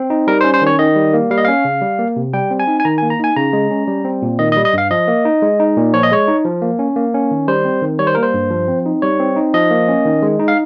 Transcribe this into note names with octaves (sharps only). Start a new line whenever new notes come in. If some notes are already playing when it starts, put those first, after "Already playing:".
Already playing: C4
D#4
G3 A#4
C#4 C5
C5
D#3 C#5
D#3 D#5
G3
A#3
G3 F5
D#5
C#4 F5
C#3
G3
A#3
C3
G3 G5
C4
G#5
D#4
G#5
D#3 A#5
G#5
A#3
A#5
D#4 G#5
C#3 A#5
G#3
C#4
G3
C4
A#2
D#3 D#5
D#5
G3
D#5
G2 F5
F3 D#5
A#3
D#4
G#3
D#4
A#2
F3 C#5
D#5
G#3 C#5
D#4
F3
A#3
C#4
A#3
C#4
D#3
G3 C5
C4
D#3
G3 C#5
C5
A#3 A#4
C5
G2
F3
C4
D#4
G3 C#5
C4
D#4
F3 D#5
A#3
C#4
D#3
G#3
D#4
F5